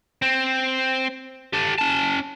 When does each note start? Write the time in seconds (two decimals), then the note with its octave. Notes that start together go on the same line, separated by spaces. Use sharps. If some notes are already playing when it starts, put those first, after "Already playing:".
0.22 C4
1.53 G4 A4
1.78 C#4 A5